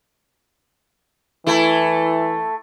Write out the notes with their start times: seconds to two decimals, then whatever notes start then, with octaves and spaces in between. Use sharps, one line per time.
1.47 E3 A3 E4